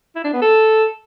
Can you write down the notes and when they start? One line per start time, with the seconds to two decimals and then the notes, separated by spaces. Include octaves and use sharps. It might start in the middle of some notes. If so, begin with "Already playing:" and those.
0.16 E4
0.24 D4
0.33 B3
0.42 A4